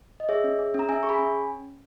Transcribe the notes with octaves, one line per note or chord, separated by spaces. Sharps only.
D#5
G#4 C#5 E5
C#4
G#4
C#4 A#5
C#4 E5 G#5
G#4 C#6
G#5 B5
C#4